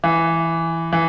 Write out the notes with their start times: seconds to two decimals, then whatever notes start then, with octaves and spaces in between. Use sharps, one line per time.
0.04 E3
0.92 E3